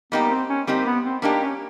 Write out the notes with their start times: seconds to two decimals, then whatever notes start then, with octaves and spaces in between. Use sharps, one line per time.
0.12 G3 A#3 B3 D#4 G4
0.30 C4
0.49 C#4
0.67 G3 A#3 C4 D#4 G4
0.86 B3
1.04 C4
1.22 G3 A#3 D4 D#4 G4
1.41 C#4